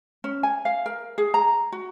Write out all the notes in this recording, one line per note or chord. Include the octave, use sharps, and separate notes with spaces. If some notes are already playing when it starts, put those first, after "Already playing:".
C#4
G#5
F5
A#4
G#4
A#5
F#4